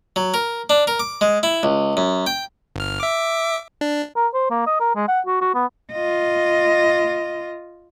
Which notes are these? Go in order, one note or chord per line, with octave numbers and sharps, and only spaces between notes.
F#3
A#4
D4
A#4
D6
G#3
E4
C#2
F#2
G5
G1 F6
E5 D6
D4
A#4
C5
A#3
D#5
A#4
G#3
F#5
F#4
F#4
B3
F4 D#5